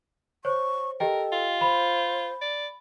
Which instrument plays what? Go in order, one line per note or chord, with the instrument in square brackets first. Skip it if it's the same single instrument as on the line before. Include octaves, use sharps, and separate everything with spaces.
[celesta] C5 C#5 [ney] C#6
[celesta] G4 D#5 G5 [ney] A4 [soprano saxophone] A#4
[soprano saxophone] F4
[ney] C5 [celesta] B5
[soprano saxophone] D5